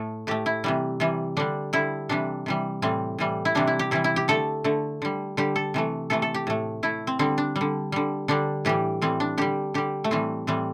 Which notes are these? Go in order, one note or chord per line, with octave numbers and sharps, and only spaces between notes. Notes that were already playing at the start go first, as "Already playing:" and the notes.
Already playing: A2 A3
A2 A3 G4
E4
C3 E3 G3
C3 E3 G3
D3 G3 D4
D3 G3 E4
C3 E3 G3 D4
C3 E3 G3
A2 E3 G3 C4
A2 E3 G3
E4
C3 E3 G3 D4
E4
G4
C3 E3 G3 E4
E4
G4
D3 A3 A4
D3 A3
D3 G3
D3 G3 G4
A4
C3 E3 A3
C3 E3 A3 A4
A4
G4
A2 A3
A2 A3 E4
C4
D3 G3 C4
D4
G3
D3
D3 G3
D3 G3 D4
A2 E3 G3 G4
A2 E3 G3 C4
D4
D3 G3 G4
D3 G3 G4
A3
A2 E3 G3 C4
A2 E3 G3 C4